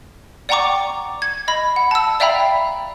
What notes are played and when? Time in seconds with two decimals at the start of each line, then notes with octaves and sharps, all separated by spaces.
0.49 D5 F#5 G5 A#5 C#6 D6
1.22 G#6
1.48 D#5 B5
1.76 F#5
1.91 A5 E6
2.20 D5 E5 F5 G5 A#5 B5